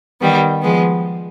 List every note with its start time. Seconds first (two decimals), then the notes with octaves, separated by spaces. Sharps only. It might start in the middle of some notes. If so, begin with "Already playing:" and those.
0.21 D#3 G3 B3
0.62 F3 G#3 B3